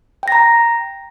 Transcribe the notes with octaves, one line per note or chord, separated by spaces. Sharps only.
G5 A#5 A#6